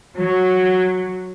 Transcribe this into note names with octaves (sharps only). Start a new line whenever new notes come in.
F#3